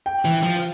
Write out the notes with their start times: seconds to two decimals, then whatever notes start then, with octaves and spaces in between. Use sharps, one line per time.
0.06 G5
0.25 E3
0.43 F3